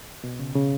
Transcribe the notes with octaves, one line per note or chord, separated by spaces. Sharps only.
B2
C#3
C#3